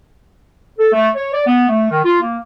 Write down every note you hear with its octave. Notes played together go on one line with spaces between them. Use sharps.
A4
A3
C#5
D5
B3
A3
D#3
F4
A#3